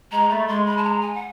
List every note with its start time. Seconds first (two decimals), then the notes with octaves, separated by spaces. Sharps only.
0.12 G#3 A#5
0.29 A3 B5
0.47 G#3 C6
0.65 B5
0.77 A5
0.83 A#5
1.01 G#5
1.15 F#5